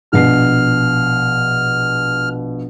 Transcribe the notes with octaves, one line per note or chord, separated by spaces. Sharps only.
A#1 B2 F6 C7